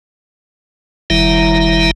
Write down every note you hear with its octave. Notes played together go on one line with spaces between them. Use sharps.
F#1 D#3 G3 E4 E5 A#5